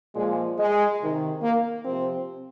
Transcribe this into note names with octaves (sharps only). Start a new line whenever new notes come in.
A#2 F3 G#3
G#3
C3 D#3
A#3
C3 F3 C4